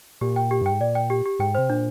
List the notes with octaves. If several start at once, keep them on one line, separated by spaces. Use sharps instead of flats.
A#2 G4
G5
G4
G2 G5
G#2
A#2 D5
G5
G4
G4
G#2 G5
C3 C5
A#2 D4